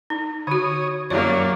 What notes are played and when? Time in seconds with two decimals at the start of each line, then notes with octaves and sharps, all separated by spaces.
0.10 D#4
0.47 D3 F#4 C#5 D#6
1.10 F#2 F#3 A#3 C#5 D5 C#6